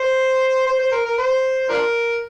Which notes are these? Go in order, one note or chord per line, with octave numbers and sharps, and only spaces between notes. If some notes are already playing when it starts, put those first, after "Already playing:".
Already playing: C5
C5
C5
A#4
A#4
C5
D4 F4 A#4